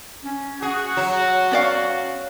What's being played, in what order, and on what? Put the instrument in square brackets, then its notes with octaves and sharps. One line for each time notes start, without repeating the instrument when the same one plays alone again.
[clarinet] C#4
[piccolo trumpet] F#4 [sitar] G#4 [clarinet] F#5
[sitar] F#3
[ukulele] C#4 D5 F5